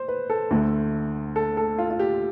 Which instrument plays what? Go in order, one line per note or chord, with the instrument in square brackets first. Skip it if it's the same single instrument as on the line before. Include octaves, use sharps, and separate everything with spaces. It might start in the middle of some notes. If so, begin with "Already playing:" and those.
Already playing: [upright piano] C5
B4
A4
D2 D3 A3
A4
A4
F4
F4
G4